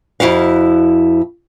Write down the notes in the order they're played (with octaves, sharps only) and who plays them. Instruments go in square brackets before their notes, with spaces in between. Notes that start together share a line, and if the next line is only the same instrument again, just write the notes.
[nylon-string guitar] F2 E4 F#4 F5